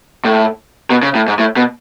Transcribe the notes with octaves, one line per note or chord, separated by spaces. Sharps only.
A2
B2
C#3
A2
G#2
A2
B2